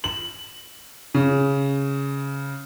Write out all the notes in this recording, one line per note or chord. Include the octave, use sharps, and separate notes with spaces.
F#7
C#3